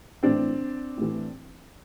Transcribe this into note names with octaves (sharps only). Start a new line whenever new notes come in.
A2 E3 C4 D4
A2 E3